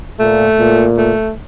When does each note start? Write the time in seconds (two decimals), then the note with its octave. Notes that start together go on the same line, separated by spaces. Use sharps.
0.19 A#2 A3
0.58 A#2
0.97 A3